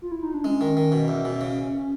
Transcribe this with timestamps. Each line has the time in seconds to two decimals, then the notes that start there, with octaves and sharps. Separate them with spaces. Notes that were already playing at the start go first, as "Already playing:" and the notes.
0.02 F4
0.12 E4
0.23 D#4
0.34 D4
0.44 G#3 C#4
0.61 D#3
0.77 D#3
0.92 B2
1.08 E2
1.25 B2
1.41 C#3